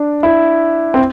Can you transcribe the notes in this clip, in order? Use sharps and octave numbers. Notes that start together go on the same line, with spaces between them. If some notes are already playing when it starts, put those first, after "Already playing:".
Already playing: D4
E4
C4